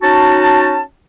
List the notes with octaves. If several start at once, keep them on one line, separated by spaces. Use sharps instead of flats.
C#4 D#4 F#4 A5